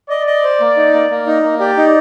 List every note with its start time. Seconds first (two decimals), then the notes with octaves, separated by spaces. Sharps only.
0.10 D5 D#5
0.27 D#5
0.44 C5
0.61 A#3
0.77 D#4
0.94 A#3
1.10 A#3
1.27 D#4
1.43 A#3
1.60 G4 D5
1.77 D#4